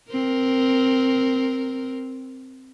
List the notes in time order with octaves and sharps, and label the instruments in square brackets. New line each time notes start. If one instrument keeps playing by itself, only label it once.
[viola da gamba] C4 A#4